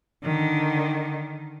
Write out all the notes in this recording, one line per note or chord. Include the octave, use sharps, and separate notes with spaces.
D3 D#3